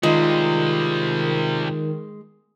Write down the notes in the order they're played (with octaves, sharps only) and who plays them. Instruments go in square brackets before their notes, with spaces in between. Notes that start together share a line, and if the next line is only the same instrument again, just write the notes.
[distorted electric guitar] C3 G3 [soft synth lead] D#3 [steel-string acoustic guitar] G#3 [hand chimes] F4